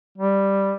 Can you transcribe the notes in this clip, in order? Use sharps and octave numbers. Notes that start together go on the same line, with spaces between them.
G3